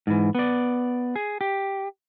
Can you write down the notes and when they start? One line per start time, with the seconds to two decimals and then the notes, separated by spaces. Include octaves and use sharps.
0.07 G#2 E3
0.35 B3 D5
1.16 G#4
1.41 G4